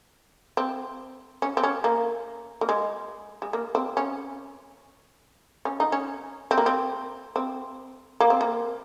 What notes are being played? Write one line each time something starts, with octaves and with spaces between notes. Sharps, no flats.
C4
C#4
C4
C#4
A#3
A#3
G#3
G#3
A#3
C4
C#4
C#4
D#4
C#4
C4
A#3
C4
C4
A#3
C4
A#3